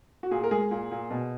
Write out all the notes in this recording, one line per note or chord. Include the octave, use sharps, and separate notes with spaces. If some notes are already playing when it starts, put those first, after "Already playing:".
F#4
A#2 G#4
A#4
G#3 G#4
A#2
A#2
B2